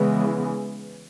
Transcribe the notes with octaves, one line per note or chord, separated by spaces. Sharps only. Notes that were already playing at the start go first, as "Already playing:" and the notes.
Already playing: C#3 E3 G#3 B3